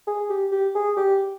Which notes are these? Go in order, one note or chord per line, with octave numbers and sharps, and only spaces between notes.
G#4
G4
G4
G#4
G4